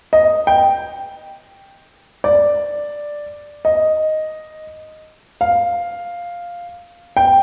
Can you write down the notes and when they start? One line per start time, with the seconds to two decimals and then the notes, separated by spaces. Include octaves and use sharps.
0.13 D#5
0.47 G5
2.24 D5
3.65 D#5
5.41 F5
7.17 G5